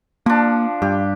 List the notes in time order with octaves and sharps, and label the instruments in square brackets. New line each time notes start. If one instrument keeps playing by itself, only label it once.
[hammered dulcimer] F3 D4 [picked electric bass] A#3
[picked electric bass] G2 [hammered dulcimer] G4